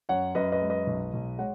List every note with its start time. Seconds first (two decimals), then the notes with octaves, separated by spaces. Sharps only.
0.09 F#2 C#5 F#5
0.35 F#2 B4 D#5
0.52 B4 D#5
0.61 G#3
0.70 B4 D#5
0.87 B1
1.13 B1
1.38 G#3 C#5 F#5